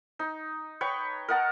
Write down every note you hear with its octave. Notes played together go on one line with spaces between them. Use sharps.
D#4
B4 C#5 G5 C#6
A#4 D#5 F#5 A5